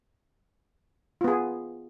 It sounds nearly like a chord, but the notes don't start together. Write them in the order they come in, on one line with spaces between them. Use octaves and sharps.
F4 B3 G#4